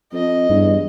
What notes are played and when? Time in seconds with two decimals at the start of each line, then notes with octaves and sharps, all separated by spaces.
0.13 F2 D#5
0.50 E2 G2